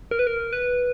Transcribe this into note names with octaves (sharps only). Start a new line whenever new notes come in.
A#4
B4
A#4
B4